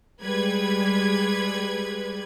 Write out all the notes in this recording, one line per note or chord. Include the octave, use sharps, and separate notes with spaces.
G3 G#3 B4 G#6